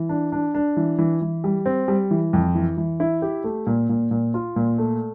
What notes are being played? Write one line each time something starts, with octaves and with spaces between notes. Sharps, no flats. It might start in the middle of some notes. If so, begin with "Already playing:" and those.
Already playing: E3
D4
D4
D4
E3
E3
E3
G3
C4
G3
E3
F2
E3
E3
E4
G4
A3
A#2
A#2
A#2
F4
A#2
A3